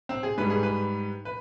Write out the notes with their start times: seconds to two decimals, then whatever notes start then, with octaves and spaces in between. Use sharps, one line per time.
0.09 C4
0.23 G#4
0.37 G#2 G3 B4
0.50 G#4
0.63 B4
1.25 B4